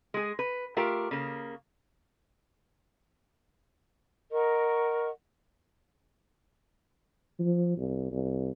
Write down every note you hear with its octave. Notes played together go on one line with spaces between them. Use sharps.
G#3 G#4
B4
A3 F4 G4 A#4
C#3 A#3
A#4 D#5 F#5 C#6
F3
C2
C2